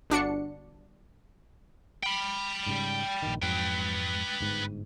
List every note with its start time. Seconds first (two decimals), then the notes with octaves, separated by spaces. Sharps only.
0.10 G1 D4 F#4 C#7
2.03 G5 B5
2.66 G#2 C#3 G3
3.22 A#1 G2 D#3
3.42 F2 G#2 F#3 B4 G5
4.40 G1 G#2